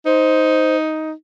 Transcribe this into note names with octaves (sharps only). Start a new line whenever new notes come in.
D#4 C5